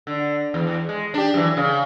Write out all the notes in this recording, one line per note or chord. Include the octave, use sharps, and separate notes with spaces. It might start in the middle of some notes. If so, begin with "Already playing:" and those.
D3
E2
G#3
D4 G4
F#2 E3
C#3